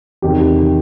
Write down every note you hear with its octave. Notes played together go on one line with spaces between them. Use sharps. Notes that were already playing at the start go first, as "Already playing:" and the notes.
E2 C3 D#3 G4